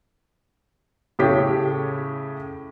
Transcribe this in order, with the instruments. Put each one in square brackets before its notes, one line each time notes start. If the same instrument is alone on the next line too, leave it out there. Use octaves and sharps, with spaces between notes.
[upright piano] A2 C#3 G4 C#5 B6